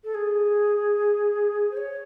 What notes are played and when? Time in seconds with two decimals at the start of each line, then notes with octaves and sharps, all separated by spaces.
0.04 A4
0.14 G#4
1.71 C5
1.76 C#5